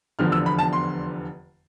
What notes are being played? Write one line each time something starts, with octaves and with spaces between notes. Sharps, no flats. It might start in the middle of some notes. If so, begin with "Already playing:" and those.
F1 E2 D3 F3 F6
E6
B5
A5
C6